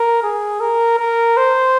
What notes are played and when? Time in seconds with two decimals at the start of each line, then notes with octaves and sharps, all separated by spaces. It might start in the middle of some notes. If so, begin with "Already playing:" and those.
Already playing: A#4
0.23 G#4
0.61 A#4
0.99 A#4
1.37 C5